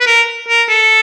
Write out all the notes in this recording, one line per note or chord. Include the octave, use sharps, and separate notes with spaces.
B4
A#4
A#4
A4